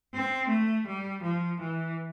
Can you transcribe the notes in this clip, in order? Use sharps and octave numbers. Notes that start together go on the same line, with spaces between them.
C4
A3
G3
F3
E3